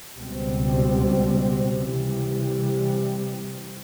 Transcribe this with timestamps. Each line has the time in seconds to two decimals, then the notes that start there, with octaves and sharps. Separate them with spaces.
0.15 C#2 B2 G3 C4
1.87 C3 E3 G3